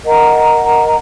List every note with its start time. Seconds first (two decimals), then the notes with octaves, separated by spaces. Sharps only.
0.04 A#4 D#5 F#5 A#5